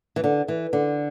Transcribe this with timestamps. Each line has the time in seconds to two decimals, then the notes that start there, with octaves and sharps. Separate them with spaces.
0.16 E3
0.24 D3
0.48 E3
0.73 D3